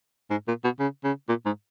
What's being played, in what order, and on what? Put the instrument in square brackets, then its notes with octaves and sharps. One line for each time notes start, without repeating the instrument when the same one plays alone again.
[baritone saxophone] G#2
A#2
B2
C#3
C#3
A#2
G#2